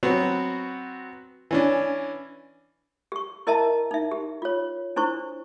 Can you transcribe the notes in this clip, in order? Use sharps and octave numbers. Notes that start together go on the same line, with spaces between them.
F#3 B3 C4 F#4
E3 C#4 D4
G4 C#6
E4 A#4 D#5 E5 A5 A#5
D#4 E5
G4
F4 C#5
D4 E4 C5 C#6